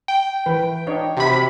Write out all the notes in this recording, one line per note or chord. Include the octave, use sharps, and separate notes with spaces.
G5
E3 B4
D4 D#4 C#5
C3 F#4 B5